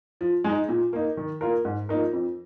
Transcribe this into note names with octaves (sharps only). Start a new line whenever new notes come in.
F3
G#3 D#4
A#2
A#3 D#4
D#3
A#3 F4 A#4
G#2
F3 A#3 D#4 A#4
F2